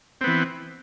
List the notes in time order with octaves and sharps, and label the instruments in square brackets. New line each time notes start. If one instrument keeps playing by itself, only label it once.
[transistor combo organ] C4
B3
E3